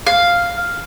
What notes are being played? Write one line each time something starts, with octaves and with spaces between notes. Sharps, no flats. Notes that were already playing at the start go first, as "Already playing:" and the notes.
F5